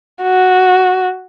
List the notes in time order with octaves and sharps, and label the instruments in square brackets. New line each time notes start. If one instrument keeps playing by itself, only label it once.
[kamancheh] F#4